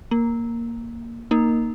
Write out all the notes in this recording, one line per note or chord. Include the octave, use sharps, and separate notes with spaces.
A#3
A#3 D#4